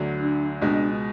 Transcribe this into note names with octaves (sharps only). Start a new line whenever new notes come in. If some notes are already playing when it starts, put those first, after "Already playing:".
Already playing: D2 D3 F#3
D4
C#2 B2 G#3 D4